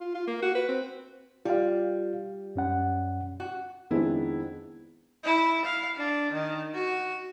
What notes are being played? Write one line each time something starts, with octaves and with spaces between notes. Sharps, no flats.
F4
F4
A#3
F#4
B4
C4
G3 F4 F5
F#2 C#4 F#5
F#4
F2 D#3 G#3 B3 D4 E4
E4
F5
D4
D#3
F#4